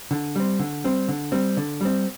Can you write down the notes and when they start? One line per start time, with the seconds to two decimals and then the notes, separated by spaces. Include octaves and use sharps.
0.11 D3
0.36 G3 C4
0.59 D3
0.84 G3 C4
1.08 D3
1.32 G3 C4
1.57 D3
1.81 G3 C4